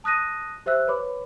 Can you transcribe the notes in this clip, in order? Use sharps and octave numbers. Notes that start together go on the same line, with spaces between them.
A5 D#6 F#6 A#6 D#7
G4 C5 E5 E6 F#6
B4 C#5 B5 D6